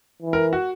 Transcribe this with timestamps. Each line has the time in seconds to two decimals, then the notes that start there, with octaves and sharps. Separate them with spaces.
0.22 E3
0.33 A#4
0.53 F#4